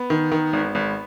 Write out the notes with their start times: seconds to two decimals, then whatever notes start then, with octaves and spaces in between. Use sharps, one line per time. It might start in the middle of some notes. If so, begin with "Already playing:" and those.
Already playing: B3
0.10 D#3
0.32 D#3
0.53 G#1
0.75 G#1